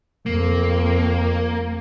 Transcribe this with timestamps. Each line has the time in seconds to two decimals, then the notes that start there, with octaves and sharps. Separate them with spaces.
0.26 F2 A#3